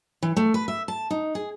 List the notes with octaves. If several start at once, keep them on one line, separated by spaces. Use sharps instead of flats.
E3
A3
B4
E5
A5
D#4
G#4